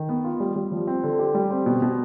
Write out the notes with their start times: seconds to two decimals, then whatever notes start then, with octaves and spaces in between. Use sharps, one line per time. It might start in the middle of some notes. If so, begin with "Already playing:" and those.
Already playing: D#3
0.09 B3
0.24 F4
0.40 G3
0.56 G3
0.71 F3
0.87 C4
1.03 D3
1.19 G4
1.35 G3
1.51 C4
1.66 B2
1.82 B2